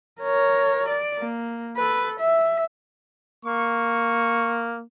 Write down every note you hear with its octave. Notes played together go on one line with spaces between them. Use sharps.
A#4 C#5
D5
A#3
A4 B4
E5
A#3 C#6